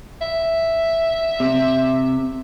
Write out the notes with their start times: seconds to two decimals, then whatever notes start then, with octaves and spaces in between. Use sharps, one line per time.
0.21 E5
1.40 C3